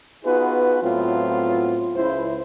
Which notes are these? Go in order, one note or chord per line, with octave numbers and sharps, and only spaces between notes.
B3 D#4 F4 F#4 G#4 B4
A2 F#3 B3 C4 F4
C#2 E4 C5